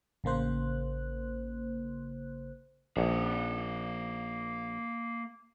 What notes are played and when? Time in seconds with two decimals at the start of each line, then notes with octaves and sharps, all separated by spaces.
0.24 A1 C#3 A#3 C5 F#6
2.97 A#1 A#3 F#5